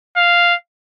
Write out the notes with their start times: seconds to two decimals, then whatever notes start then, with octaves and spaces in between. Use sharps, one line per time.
0.17 F5